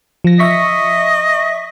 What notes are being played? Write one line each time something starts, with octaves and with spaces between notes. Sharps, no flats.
F3 A#6
D#5 E5 C#6 B6